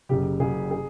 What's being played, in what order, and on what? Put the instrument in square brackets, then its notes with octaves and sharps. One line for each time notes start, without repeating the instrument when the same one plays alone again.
[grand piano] F#1 F#2 C#3 G4
F#1 F#2 C#3 G#4
G#4